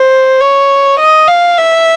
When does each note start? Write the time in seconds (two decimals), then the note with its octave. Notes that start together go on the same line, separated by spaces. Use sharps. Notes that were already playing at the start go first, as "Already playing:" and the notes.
Already playing: C5
0.41 C#5
0.99 D#5
1.28 F5
1.57 E5